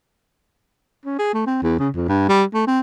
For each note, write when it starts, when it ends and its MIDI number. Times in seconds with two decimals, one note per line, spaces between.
1.05 1.16 61
1.19 1.33 68
1.34 1.42 57
1.46 1.60 60
1.62 1.78 40
1.79 1.89 49
1.95 2.06 41
2.09 2.25 43
2.29 2.44 55
2.54 2.64 57
2.67 2.80 60